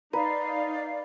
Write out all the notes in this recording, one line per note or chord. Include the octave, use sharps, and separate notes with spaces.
D#4 B4 D5 F5 A#5